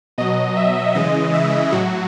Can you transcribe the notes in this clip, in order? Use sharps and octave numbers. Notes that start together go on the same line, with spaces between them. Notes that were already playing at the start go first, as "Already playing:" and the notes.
B2 F#3 D#5
E5
C#3 E3 G#3 D#5
E5
A2 F#3 F#4